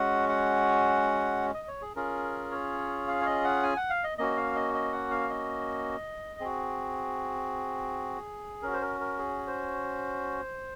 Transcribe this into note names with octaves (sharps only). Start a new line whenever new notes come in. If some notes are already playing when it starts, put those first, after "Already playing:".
Already playing: G#3 C#4 F#4 F#5
F#5
D#5
C#5
G#4
C#4 F4 G#4 A#4
C#5
F5
C#5
D#5
F#5
G#5
F#5
F5
D#5
A#3 C#4 F#4 D#5
F5
D#5
D#5
F#5
F5
D#5
C4 F#4 G#4
C#4 F#4 A#4
C5
A#4
A#4
G#4
C5